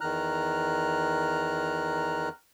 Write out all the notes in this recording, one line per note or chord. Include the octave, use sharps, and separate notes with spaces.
E2 D#3 A#5 F6 F#6